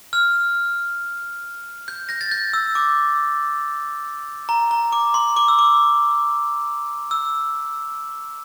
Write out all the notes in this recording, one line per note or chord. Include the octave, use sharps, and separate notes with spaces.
F6
G6
G6 A#6
A6
G6
E6
D6
A#5
A#5
D6
C6
D6
E6
D6
E6